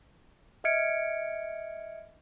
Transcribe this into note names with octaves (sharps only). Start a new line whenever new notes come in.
D#5 E5 F6 G#6 C#7 D7